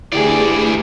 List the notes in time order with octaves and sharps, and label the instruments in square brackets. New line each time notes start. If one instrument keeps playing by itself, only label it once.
[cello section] D2 A3 [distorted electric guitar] E3 D5 [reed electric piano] E4 G4 G#4